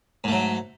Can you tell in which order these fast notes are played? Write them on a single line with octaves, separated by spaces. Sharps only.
G#2 A3 F#3